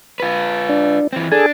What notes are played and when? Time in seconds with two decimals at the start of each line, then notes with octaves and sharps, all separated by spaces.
0.20 F4 B4
0.69 D4
1.13 E3 C4
1.32 D4 G#4 A4 G#5